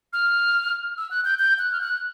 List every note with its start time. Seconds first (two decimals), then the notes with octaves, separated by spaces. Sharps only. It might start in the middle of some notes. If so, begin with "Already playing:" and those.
0.13 F6
0.97 E6
1.11 F#6
1.25 G6
1.39 G6
1.59 F#6
1.72 F6
1.81 F#6